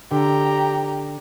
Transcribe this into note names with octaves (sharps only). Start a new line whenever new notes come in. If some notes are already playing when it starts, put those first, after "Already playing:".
D3 G4 A#5